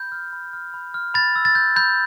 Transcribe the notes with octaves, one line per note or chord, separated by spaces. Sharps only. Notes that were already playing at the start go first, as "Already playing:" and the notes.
Already playing: B5 G6
F6
B5
F6
B5
F6
B5 A6
E6
A6
G6
B5 G6